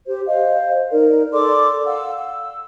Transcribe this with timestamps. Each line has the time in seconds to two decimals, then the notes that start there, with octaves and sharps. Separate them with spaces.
0.07 G4 C5
0.27 C5 D#5 F5
0.92 D#4 A#4 D5
1.33 A4 D5 C6 D6
1.86 F5 F#5 E6
2.18 E6